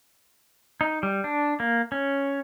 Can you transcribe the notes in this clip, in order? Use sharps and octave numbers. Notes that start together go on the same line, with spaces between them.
D#4
G3
D4
A#3
C#4